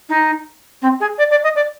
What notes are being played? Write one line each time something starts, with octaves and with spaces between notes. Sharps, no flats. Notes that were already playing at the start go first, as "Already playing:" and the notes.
D#4
C4
G#4
D5
D5
D#5
D5